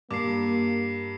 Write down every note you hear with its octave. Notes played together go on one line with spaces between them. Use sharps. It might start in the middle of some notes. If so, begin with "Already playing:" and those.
G2 A#3 D6 C7